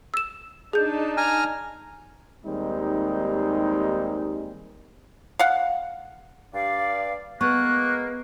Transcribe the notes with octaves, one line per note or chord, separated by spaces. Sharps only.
E6 E7
D4 D#4 G#4 A5 G6
G#5 A#5 F6
D#2 G3 G#3 C4 D#4
F5 F#5
G2 D5 F5
G#3 A#3 B3 C#6 F#6